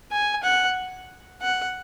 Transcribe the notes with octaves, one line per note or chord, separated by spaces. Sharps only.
G#5
F#5
F#5